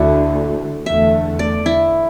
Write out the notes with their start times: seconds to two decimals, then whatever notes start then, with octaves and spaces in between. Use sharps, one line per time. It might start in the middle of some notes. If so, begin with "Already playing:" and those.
Already playing: D2 D3 A3 D4 E4 F#4
0.86 E2 D3 A3 E5
1.39 D5
1.66 E4